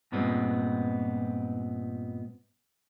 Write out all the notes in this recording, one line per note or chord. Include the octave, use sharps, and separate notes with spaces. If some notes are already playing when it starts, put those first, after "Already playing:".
G2 A#2 G#3 B3 C4